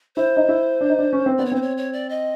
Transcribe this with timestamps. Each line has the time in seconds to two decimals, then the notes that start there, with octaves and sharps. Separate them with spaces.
0.16 E4 C5
0.37 D#4
0.49 E4
0.81 D4
0.90 D#4
0.99 D4
1.13 C#4
1.26 C4
1.38 B3 D5
1.45 C#5
1.52 C4 C5
1.62 C#5
1.77 C#5
1.93 D5
2.09 D#5